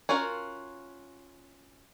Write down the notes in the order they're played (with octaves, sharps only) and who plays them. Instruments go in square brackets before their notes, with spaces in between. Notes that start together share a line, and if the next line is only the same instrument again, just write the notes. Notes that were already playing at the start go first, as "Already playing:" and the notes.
[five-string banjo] C#4 F4 F#4 A#4